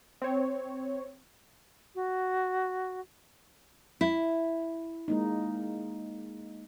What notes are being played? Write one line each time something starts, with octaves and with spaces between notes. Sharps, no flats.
C4 C#5
F#4
E4
G#3 A#3 D#4